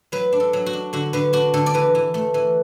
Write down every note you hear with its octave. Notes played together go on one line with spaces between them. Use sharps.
F#3 B4
D4
A4
F#3
F#4
D4
D3 F#4
D3 B4
D4 F#4
D3 A4
D5
E3 B4
E3
A3
E3